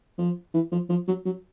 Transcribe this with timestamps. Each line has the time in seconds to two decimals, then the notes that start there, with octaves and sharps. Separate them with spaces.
0.18 F3
0.54 E3
0.72 F3
0.90 F3
1.08 F#3
1.25 F#3